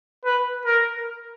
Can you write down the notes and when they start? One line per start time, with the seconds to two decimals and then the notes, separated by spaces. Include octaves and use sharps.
0.25 B4
0.65 A#4